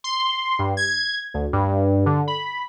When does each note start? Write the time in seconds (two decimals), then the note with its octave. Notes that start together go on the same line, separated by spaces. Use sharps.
0.04 C6
0.59 G2
0.77 G#6
1.34 D2
1.53 G2
2.06 D3
2.28 B5